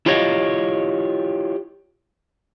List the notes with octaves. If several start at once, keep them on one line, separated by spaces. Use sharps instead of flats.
E4 F4 G4 C#5 D#5 F5